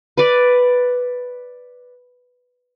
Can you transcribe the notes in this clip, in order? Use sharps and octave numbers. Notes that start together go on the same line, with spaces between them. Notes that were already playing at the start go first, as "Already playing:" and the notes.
B4 D5